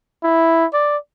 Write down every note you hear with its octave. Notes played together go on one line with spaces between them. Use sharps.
E4
D5